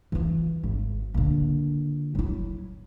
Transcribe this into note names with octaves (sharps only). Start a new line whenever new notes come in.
E3 F4
G#1
A#2 D3
F#3 E4